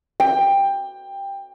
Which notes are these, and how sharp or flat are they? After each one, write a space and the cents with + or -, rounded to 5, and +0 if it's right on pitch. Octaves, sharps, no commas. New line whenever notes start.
G5 +15